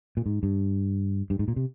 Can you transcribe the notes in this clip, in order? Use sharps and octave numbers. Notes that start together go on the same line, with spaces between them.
A#2
G#2
G2
G2
G#2
A#2
C3